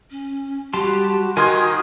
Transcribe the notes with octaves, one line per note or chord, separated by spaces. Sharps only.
C#4
G3 F#4 G4 A5 C6
D#3 A#4 G#5 C6 D#6 G#6